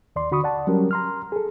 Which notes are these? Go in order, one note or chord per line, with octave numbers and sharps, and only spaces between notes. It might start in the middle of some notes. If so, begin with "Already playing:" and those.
D#2 D5 C6
D3 F#4 B5 C#6 D#6
D5 F#5 A5
F#3 G3 C#4 G4 A#4
A#5 C6 F6
G#4 A4